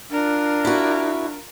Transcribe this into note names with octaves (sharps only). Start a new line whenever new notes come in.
D4 F4 A#4
E4 F#4